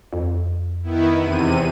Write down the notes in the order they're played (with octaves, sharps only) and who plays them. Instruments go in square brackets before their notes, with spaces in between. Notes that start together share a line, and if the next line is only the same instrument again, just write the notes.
[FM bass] F2
[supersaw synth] D#3 B3 E4
E2 C3 D#7